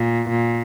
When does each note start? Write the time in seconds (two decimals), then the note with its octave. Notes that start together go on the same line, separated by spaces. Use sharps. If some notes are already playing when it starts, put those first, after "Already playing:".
Already playing: A#2
0.30 A#2